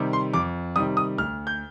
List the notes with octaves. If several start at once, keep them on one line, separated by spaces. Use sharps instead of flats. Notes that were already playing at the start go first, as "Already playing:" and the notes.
Already playing: C3 D#3 G3
C6
F2 D6
C3 D#3 G3 D#6
D#6
D2 F6
G6